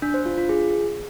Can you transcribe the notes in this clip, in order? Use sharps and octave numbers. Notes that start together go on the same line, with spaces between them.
D4
C5
F4
F4
G#4